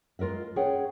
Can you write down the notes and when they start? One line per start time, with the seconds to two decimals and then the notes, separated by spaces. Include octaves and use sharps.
0.19 G#3 F4 A#4 D#5 E5
0.56 C#4 G#4 C#5 F#5 G5